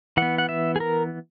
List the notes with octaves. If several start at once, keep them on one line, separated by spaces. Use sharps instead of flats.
E3 B3 F#5
F#5
E5
G#4
A#4